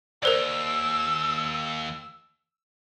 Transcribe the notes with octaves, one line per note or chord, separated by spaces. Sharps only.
D#2 A#4 C5 D5 E6